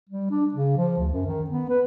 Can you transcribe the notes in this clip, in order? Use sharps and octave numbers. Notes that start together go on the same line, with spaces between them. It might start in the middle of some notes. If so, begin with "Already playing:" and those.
G3
D4
C#3
F3
D2
F#2
D#3
B3
B4